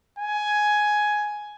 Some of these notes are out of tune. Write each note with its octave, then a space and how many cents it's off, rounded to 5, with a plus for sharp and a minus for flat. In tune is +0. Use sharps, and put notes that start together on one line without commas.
G#5 +10